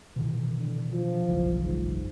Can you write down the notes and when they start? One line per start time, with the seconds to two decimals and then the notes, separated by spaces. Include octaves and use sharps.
0.16 B2 D#3 E3
0.59 D3
0.92 F3
1.28 F#1 B1 E3
1.62 G#2